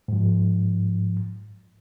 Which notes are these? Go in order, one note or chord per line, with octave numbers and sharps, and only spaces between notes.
G#2 F3